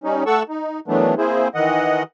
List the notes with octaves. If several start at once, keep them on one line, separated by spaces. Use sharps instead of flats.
G3 C#4 D#4
A3 A4 F#5 A5 C#6 E6
D#4
D#3 E3 F#3 A3 B3 D4
A#3 C4 E4 G#4 C5
D#3 E3 D#5 F#5